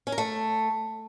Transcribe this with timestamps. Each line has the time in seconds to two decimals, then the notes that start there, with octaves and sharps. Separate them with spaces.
0.07 C#4
0.12 A#4
0.18 A3